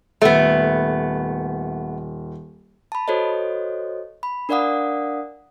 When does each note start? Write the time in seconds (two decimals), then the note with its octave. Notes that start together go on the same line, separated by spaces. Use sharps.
0.22 D#1 A3 B3
2.92 A5 B5
3.08 F#4 A4 C5 C#5 D#5
4.23 B5
4.49 D4 A#4 D5 F5 F#5 D#6